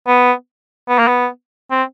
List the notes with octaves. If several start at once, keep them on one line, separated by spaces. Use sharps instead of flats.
B3
B3
A#3
B3
C4